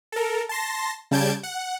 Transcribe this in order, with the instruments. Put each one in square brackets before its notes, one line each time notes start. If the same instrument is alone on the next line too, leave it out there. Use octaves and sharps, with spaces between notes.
[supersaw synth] A4 A#4
A5 C6 A#6
C#3 G3 A5 G6 G#6 D7
F#5